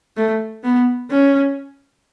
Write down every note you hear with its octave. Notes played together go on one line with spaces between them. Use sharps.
A3
B3
C#4